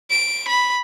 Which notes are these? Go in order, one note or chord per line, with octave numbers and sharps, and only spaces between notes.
D7
B5